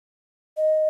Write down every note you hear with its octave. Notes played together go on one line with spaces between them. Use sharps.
D#5